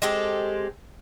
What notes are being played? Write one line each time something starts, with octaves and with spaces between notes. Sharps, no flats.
G#3 C4 G4 A4